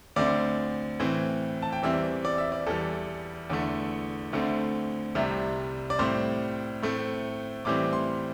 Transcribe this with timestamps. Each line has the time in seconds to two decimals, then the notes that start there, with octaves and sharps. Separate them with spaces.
0.16 D2 D3 C4 D5
1.00 A2 E3 C4
1.62 A5
1.73 G5
1.83 E2 E3 G3 C4 E5
2.25 D5
2.38 E5
2.52 D5
2.67 E2 E3 G3 A4
3.50 E2 D3 A3
4.33 D2 D3 A3 C4
5.15 C2 C3 G3
5.90 D5
5.99 A2 G3 C4 C5
6.83 A2 A3 C4
7.65 A2 E3 G3 C4 D6
7.93 C6